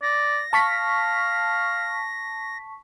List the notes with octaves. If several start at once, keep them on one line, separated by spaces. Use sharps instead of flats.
D5 A#6
F5 A5 C#6 B6